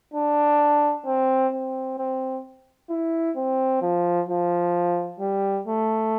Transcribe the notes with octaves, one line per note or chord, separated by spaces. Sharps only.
D4
C4
C4
C4
E4
C4
F3
F3
G3
A3